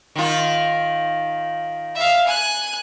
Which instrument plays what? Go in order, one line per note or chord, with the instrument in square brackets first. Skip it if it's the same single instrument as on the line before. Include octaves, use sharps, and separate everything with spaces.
[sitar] D#3 F4
[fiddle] E5 F5
G#5 F#6